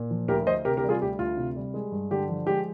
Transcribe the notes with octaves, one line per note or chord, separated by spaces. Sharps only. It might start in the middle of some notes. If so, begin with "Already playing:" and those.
Already playing: A#2
F3
D2 G4 A#4
D2 C5 D#5
C3 G4 A#4
G4 A#4
G3
F4 G#4
D2 G4
D2 F4
C3
G3
G#3
G2
D3 G4
F3
G#3 G4